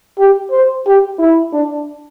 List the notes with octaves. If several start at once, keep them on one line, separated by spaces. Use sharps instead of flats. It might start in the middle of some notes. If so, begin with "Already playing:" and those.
G4
C5
G4
E4
D4